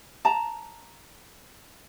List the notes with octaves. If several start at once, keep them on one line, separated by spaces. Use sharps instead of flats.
A5 A#5